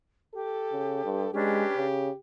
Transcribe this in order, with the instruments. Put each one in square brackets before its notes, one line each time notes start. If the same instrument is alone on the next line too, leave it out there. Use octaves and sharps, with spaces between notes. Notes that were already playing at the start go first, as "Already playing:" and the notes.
[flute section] G4 [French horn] A4
[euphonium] C#3
G2
[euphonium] G#3 [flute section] C#4 D4 B4 [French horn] G4
[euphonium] C#3